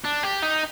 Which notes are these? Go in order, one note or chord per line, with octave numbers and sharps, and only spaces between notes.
D4
G4
D#4